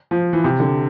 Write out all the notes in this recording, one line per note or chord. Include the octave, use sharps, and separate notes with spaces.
F3
E3
C3
D3